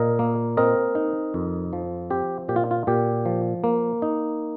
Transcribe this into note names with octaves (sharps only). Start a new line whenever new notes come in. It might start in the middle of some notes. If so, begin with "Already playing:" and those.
Already playing: A#2 A#4 D#5
A#3
C4 A#4 D#5
D#4
F2
F3
C4 G4
A#2 G4
F4
F4
A#2 G4
F3
A#3
D#4